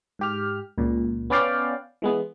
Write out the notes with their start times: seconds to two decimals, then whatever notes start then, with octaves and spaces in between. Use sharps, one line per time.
0.19 G#2 G4 F6
0.78 C#2 A#2
1.30 B3 C#4 B4 D5 F5 G5
2.02 E3 G#3 B3